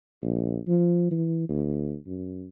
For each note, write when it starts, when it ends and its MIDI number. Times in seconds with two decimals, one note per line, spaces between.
0.22 0.58 34
0.68 1.08 53
1.11 1.44 52
1.49 1.96 38
2.06 2.48 42